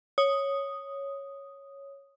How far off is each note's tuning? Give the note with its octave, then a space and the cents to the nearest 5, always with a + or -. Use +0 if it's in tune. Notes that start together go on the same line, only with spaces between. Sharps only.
C#5 +0 D#6 +0